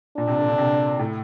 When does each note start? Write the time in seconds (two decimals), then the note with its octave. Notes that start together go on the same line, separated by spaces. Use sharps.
0.17 A#2 D4
0.27 C3
0.38 D3
0.48 D3
0.58 C3
0.99 A2